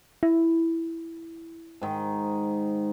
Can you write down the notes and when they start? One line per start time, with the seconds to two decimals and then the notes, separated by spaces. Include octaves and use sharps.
0.23 E4
1.82 G#2 D#3